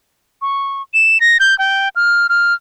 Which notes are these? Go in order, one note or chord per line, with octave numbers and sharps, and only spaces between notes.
C#6
E7
A#6
G6
G5
F6
F6